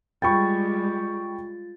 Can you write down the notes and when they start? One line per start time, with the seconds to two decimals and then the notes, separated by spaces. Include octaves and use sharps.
0.22 G3 G#3 F4 G5 B5 C#6 A6